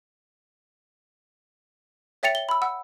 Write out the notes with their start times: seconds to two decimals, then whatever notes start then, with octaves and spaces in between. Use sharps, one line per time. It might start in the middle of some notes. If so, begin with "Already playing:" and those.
2.23 C#5 E5 G5 A6 C#7 F7
2.35 G7
2.49 B5 E6
2.62 F#5 E6